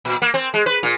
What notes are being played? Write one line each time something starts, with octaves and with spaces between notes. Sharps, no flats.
A#2
A#3
C4
G#3
B4
A#2